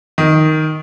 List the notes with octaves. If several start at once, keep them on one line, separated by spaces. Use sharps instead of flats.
D#3